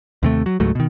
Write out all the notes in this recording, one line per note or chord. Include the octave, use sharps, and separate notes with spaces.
D#2 C3 A3
F#3
C#2 G#2 F#3 A3
B2 D#3